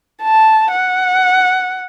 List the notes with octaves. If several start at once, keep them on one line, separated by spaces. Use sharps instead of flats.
A5
F#5